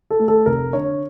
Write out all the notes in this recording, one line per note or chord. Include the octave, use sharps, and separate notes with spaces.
A4
A3
A4
F1 A#4
D3 C#5